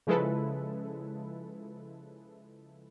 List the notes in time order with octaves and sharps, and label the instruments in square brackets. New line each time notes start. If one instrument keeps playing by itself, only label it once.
[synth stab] C#3 F3 G#3 E4 A4 B4